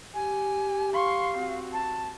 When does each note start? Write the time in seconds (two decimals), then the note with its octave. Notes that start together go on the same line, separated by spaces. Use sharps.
0.14 G4 G#5
0.93 F5 C6 C#6
1.37 C4 F#4
1.73 A5